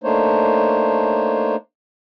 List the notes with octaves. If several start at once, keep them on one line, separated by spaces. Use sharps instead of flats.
A3 A#3 D4 D#4 C5 C#5